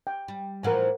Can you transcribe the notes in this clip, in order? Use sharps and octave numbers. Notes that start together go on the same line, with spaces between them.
G5
G3
A2 E3 F3 A#4 F#5 G#5